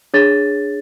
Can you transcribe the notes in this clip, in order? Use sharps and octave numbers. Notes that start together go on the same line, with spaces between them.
D4 G#4 C#5 A6